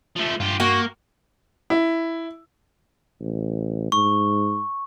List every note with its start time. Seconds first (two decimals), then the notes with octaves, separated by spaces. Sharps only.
0.16 F3 A3
0.40 G2 F4 G4
0.60 A#3 F#4
1.70 E4
3.20 A1
3.92 G#2 C#6